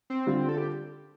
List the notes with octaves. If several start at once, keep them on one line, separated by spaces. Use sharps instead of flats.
C4
D3 G3 F4
A4
G4